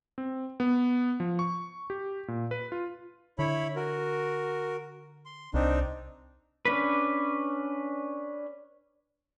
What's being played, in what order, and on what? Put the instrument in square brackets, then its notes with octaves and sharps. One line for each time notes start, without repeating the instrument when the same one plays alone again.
[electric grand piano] C4
B3
F3
C#6
G4
A#2
B4
F4
[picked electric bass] D3 [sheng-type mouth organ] E4 C#5 B5
[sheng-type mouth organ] F#4 A#4
C6
[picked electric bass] C2 [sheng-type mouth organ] C4 D4 D#4
[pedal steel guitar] C#4 D4 B4